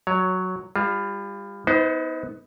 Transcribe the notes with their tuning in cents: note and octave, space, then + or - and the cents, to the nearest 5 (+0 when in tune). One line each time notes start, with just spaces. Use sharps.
F#3 +0 C#5 +15
G3 +30 F4 +0
B3 +10 D#4 +35 C5 -25